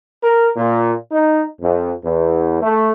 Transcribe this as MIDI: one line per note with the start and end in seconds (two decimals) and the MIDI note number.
0.23 0.48 70
0.56 0.92 46
1.11 1.41 63
1.61 1.91 41
2.04 2.61 40
2.62 2.91 57